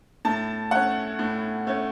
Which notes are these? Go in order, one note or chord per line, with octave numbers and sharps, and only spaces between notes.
A2 A5
A3 C#4 F#5
A2
A3 C#4